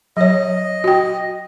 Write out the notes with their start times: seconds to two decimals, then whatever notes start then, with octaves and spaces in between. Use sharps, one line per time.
0.17 F#3 C#5 D#5
0.84 F#4 G5